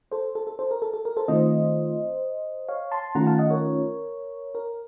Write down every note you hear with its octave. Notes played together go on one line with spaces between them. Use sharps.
A4 C5
A4
A4
A4 C5
A#4
A4
A4
A#4
A4 C5
D#3 A3 C4 F4 C5 D#5
C#5 F5
A5 C6
D#3 A3 C#4 F4 F#5 A#5
F5 A5
D#5 F#5
A#4 C#5
A#4